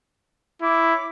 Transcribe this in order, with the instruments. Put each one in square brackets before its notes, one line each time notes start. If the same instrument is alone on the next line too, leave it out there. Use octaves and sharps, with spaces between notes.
[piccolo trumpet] E4 [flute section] C#5 D6